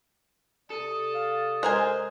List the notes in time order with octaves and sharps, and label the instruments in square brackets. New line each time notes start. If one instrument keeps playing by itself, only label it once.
[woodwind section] C3 D5 D#6 [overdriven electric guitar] A4
[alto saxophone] F5
[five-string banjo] G#3 A#4 G#5 [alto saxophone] C5